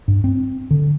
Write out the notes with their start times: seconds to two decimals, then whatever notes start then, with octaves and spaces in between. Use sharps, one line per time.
0.08 G2
0.24 C4
0.71 D3